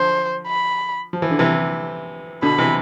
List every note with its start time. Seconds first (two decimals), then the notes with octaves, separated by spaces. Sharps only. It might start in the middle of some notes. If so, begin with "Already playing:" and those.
Already playing: D3 F3 C5
0.47 B5
1.13 F3
1.22 E3
1.31 D3
1.39 C3 E3
2.42 B2 D3 B5
2.58 C3 E3